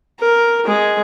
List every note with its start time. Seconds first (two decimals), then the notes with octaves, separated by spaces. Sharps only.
0.20 A#4
0.65 G#3 G#4